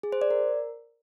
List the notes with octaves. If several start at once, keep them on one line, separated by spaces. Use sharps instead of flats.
G#4
C5
D5
A#4